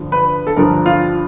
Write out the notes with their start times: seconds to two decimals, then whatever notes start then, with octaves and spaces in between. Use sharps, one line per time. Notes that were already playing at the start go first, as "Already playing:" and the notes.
Already playing: G2 D3 F3
0.12 B4
0.47 A4
0.56 G2 D3 F3 A#4
0.86 F4